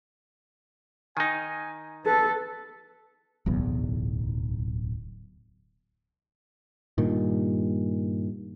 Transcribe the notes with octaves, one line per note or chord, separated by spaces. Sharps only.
D#3 D#4 G#5
A4 B4
D1 B1 E2
G2 A#2 D#3